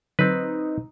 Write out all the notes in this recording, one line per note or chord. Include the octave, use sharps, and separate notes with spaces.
D3 F#3 C4 D#4 B4